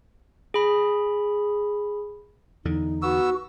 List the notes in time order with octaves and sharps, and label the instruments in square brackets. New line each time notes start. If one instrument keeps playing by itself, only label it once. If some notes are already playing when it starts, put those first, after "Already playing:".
[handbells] G#4 B5
[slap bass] E2 D3 [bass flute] D#4
[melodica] B3 E6 [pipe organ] F#4